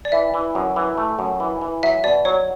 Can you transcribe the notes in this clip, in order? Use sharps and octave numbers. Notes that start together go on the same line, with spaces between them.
D5
E3 E5
E3
F#2
E3
A3
F#2
E3
E3
F#3 E5
B2 D5
F#3 C#5